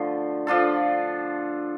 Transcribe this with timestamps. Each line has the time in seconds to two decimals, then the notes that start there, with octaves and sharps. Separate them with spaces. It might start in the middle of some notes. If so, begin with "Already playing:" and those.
Already playing: D3 F3 A3
0.47 F3 D4 F4 A4